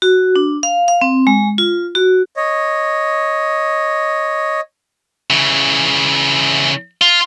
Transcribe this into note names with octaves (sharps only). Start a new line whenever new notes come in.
F#4
D4
F5
F5
C4
G#3
F4
F#4
C#5 D#5
C#3 E3
F4